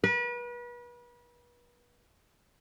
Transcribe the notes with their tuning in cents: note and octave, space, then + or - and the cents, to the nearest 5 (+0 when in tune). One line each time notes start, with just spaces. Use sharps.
B4 -35